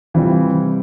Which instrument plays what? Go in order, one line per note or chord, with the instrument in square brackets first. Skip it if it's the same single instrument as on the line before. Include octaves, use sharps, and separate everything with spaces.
[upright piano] C3 G3 C4 F4 [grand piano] E3